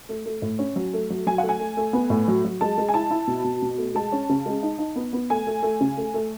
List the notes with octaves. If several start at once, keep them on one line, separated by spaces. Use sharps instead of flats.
A3
A3
A2
C#4
F#3
A3
F#3
F#3 G#5
A3 F#5
G#5
A3
A3
B3
A2
F#3
F#3
G#3 A5
G#3
G#5
E4 A5
E4
B2
B2
B2
A3
G#3 A5
C#4
C#3
G#3
D#4
D#4
B3
B3
A3 G#5
A3
A3
C#3
A3
A3